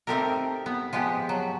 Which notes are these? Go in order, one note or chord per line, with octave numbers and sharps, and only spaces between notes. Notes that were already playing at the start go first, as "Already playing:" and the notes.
A3 C4 D#4 G4 A4 A#4
B3
F3 G#3 B3 G4
F#3